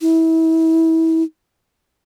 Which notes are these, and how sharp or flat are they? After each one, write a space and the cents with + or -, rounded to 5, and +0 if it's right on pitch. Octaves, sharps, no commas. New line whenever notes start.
E4 -30